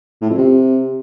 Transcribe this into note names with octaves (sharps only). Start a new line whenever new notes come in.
A2
F2
C3